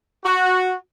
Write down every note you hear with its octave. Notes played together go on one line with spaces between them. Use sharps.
F#4